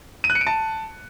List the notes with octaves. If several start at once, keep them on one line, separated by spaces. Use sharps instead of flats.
D#7
F#6
C#7
D7
A5